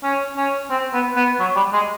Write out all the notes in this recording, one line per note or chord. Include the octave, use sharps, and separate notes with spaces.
C#4
C#4
C4
B3
B3
F#3
G3
G#3